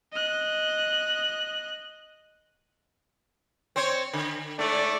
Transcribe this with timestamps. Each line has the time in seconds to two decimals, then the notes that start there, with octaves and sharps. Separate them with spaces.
0.13 D#5 F#6
3.76 C4 C5 C#5
4.13 D3
4.59 G#2 A3 D5